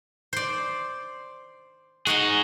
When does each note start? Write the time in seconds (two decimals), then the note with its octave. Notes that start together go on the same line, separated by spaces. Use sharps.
0.33 C5 D5
2.07 D#4 F#4 G#4 D#5 G#5